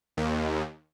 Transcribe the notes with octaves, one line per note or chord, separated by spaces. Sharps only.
D#2